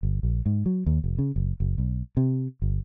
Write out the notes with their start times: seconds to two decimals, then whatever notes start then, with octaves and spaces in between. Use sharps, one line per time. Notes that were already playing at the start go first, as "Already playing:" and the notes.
0.03 G1
0.23 A#1
0.46 G#2
0.66 F#3
0.86 D#2
1.04 F1
1.19 C#3
1.36 F#1
1.60 F#1
1.78 B1
2.17 C3
2.62 G1